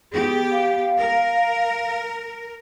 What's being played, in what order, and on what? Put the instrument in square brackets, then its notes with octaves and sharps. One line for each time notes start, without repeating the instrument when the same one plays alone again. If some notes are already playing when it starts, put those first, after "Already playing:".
[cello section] B3 G4 [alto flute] G#4
[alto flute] F5
[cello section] A#4